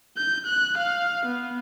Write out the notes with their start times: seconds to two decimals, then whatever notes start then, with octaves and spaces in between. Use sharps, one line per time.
0.17 G6
0.46 F#6
0.78 F5
1.26 B3